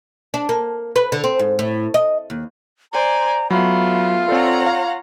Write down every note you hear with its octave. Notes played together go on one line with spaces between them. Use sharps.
D4
A#3
B4
D3
C4
G#2
A2
D#5
D#2
C5 D5 G#5 A#5
F#3 A3 B3 F4 B5
C4 A4 C#5 D5 F#5 A#5
F5